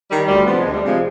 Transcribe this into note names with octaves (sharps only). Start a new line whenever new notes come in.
D#3 G3
D2 G3
C3 F3 B3
D2 G#3
G3
C3 F3 G#3